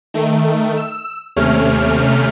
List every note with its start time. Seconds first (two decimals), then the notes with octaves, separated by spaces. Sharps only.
0.14 D#3 A3
0.78 E6
1.36 D#2 C3 A3 C#4 F6